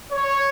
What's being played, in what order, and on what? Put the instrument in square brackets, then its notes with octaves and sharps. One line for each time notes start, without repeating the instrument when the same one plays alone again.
[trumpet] C#5